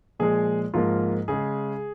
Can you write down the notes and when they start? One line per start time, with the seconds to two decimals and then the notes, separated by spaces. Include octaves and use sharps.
0.20 A#2 F3 G#3 G#4
0.74 G#2 F3 A#3 F4
1.28 C#3 G#3 G#4